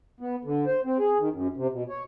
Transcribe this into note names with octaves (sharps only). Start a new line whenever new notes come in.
B3
D3
C5
C4
G#4
D#3
F#2
C3
B2
C#5